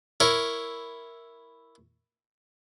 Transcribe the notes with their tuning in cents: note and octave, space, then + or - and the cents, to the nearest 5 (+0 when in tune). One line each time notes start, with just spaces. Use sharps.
E4 +0 A#4 +0 C#5 +0